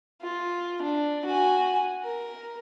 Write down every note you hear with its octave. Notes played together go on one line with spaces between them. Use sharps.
F4
D4
F#4 G#5
A#4